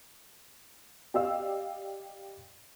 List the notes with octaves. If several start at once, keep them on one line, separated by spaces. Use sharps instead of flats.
G4 D5 D#5 F5 E6